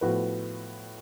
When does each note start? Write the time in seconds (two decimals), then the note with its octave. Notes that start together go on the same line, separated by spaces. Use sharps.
0.01 A2 F3 B3 F#4 B4